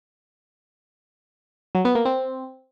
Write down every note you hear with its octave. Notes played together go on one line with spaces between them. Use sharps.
F#3
B3
A#3
C4